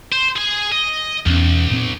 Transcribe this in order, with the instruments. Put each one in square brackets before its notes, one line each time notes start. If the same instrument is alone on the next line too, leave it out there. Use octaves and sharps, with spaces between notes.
[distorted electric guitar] C5
G#4 G#5
D#5
[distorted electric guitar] B1 [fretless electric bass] E2 C4 C#4
[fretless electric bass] A#2 C4